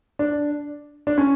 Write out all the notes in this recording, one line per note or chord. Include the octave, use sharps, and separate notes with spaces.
D4
D4
C#4